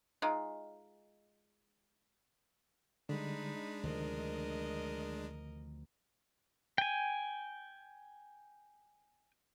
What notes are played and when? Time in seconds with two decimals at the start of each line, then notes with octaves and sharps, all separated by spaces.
0.22 G#3 D#4 F4
3.09 D3 G3 G#3 D4 D#4 B5
3.83 D2 C3 D#3 F3 A#4 D#5
6.78 G5 G#5